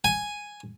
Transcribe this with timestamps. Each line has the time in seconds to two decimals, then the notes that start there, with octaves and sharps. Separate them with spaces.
0.04 G#5